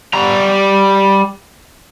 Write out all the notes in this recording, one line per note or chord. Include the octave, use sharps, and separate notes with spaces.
G3 A#5